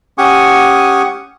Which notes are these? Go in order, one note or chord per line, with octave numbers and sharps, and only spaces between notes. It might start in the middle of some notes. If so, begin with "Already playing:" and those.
C#4 G4 F#5 G#5 C#6 D#6